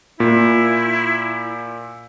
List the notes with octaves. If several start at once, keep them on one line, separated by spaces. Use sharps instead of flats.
A#2 E4